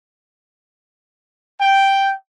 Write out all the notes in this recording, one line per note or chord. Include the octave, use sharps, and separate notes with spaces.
G5